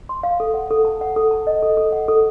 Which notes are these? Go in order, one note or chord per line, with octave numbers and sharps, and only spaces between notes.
C6
F5
A4
F#5
A4
A5
F#5
A4
A5
D#5
A4
A4
F#5
A4